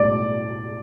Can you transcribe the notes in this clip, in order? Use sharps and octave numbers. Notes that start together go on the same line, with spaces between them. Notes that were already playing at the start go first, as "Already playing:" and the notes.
Already playing: B1 A2 G3 D5